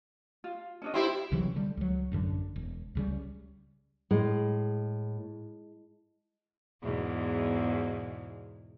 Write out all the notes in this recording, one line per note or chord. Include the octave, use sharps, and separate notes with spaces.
F4
C#4 D4 D#5
C4 E4 F4 G4 C5
C2 C#3 E3 F#3
D3 G3
C#2 F#3
A1 F#2 D3
E1
C#2 C#3 G3
A2 G#3
E2 G#2 B2